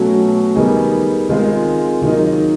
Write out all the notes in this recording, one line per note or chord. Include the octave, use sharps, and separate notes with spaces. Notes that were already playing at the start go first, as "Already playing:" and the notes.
Already playing: B2 F#3 A3 C#4 F#4
D#3 G3 B3 D#4 G#4
D#3 G#3 C4 F4 G#4
D#3 F#3 A#3 D#4